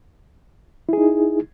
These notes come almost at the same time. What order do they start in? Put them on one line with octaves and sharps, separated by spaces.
E4 G#4 D#4